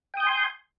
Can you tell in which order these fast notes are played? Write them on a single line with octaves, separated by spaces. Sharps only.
G5 D#6 G6 G#5 C6